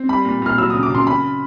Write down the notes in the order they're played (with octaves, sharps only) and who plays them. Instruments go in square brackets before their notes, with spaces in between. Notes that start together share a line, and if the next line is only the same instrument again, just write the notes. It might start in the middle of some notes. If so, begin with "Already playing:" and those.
Already playing: [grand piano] C4
G3 B5
A#2
A#2 F6
F#3 E6
D#6
C#3
D6
C#3 C6
C#3 B5